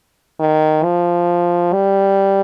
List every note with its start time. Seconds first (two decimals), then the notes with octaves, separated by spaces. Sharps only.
0.40 D#3
0.84 F3
1.73 G3